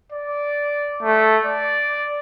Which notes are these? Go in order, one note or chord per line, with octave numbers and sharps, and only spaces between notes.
D5
A3
D5